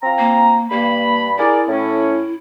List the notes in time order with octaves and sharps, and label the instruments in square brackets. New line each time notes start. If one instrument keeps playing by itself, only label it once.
[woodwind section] C4 F4 A#5
[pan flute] A#3
[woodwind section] G2 B5 [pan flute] A#3
[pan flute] E4 [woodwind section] G#4 A#4 D5
[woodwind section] A2 C#4